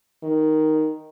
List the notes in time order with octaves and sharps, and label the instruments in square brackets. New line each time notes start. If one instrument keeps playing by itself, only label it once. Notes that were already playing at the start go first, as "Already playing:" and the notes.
[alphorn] D#3